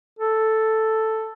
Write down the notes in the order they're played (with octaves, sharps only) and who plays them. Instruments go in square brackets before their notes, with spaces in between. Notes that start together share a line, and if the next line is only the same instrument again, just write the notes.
[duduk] A4